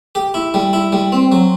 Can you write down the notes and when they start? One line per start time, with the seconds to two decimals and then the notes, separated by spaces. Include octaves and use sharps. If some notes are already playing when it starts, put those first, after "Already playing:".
0.15 G4
0.34 E4
0.54 G3
0.73 E4
0.92 G3
1.12 C4
1.32 F#3